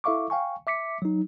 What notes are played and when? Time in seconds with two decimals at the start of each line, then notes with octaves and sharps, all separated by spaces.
0.04 E4 A4 E5 F5 C#6 D6
0.30 F5 G5 G#5 C#6
0.67 E5 D6 B6 C#7
1.02 F#3 D#4